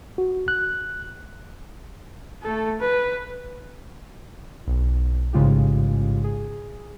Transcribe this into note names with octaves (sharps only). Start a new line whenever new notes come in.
F#4
F#6
A3 A4
B4
B1
A1 G#2 C#3 G#3 F4 G4
G#4